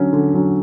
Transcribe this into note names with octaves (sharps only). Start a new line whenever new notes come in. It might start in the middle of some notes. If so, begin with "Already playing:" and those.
Already playing: D3 F#3 C#4
D3
F#3 C#4